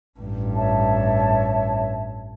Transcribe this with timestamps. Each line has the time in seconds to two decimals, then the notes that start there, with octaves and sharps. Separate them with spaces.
0.20 A1 G2
0.55 C#5 E5 A5